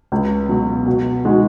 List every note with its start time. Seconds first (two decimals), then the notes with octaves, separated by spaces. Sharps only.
0.12 C#2
0.49 B2 F#3
0.86 B2
1.25 G#3 D#4 F#4